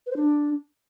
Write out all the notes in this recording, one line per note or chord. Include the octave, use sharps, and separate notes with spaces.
B4
C5
D4